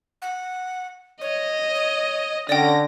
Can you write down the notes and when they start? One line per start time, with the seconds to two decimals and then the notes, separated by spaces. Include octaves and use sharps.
0.22 F#5
1.21 C#5 D#5
1.74 C#5
2.49 D3 C#4 D5 G5 A#6